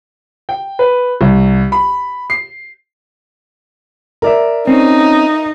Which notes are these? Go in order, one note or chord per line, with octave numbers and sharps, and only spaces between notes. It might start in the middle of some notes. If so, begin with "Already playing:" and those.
G5
B4
C2
B5
C7
A#4 D5 E5
C4 C#4 D#4